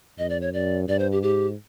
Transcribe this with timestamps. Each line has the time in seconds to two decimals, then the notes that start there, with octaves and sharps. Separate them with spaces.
0.18 F2 D#5
0.30 D5
0.41 C#5
0.53 F#2 D5
0.88 G2 D5
0.99 C5
1.12 G4
1.23 G#2 G4